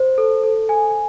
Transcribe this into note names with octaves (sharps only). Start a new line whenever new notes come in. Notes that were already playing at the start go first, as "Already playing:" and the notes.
Already playing: C5
A4
A4
G#5